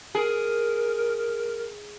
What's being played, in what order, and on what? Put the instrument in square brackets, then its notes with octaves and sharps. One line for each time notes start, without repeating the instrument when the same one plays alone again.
[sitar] G#4 [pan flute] A#4